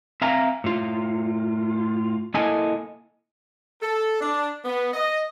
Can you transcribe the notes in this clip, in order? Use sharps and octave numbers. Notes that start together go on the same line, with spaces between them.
C4 E5 F5 G#5 A#5
A2 F4
A#3 E4 A4 D#5 G#5
A4
D4
B3
D#5